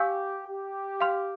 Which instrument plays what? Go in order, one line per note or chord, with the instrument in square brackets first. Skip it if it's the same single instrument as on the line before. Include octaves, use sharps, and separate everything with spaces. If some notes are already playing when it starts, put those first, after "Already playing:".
Already playing: [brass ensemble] G4 [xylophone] F5 G#5 C#6 E6 G6
[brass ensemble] G4
[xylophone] F5 C6 F6